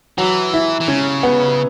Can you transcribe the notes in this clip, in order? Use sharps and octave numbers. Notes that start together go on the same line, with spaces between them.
E3 F#3
E4
E3
C#3 C#4
B3